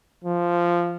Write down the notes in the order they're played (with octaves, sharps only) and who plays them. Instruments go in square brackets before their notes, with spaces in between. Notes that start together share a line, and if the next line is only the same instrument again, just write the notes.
[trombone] F3